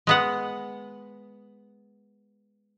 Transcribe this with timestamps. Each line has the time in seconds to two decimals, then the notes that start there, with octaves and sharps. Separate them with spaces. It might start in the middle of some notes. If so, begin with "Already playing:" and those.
0.07 G#3 B3 F#5